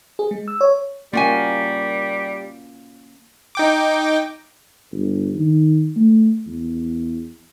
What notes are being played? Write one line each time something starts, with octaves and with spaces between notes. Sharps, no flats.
G#4
G#3
E6
C#5
G3 A#3 C#4 F4 F#4 G#5
D#4 G5 D6
G1
D#3
A3
E2